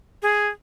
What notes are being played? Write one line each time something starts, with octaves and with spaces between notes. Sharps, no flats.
G#4